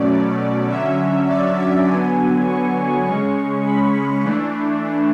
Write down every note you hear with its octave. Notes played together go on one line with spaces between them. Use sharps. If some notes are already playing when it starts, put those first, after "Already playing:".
Already playing: B2 F#3 A3 C#4 D5
D3 F#3 C#4 E5
D5
E5
D3 F#3 B3 G#5
C#6
C#3 G#3 C#4 C#6
B5
E3 A3 D4